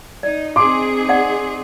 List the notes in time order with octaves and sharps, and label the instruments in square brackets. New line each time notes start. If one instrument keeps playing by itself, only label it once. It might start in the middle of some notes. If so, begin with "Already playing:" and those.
[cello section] D#4 [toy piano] D5
[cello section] C4 D#4 G#4 [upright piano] C6 D6
[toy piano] D5 D#5 F#5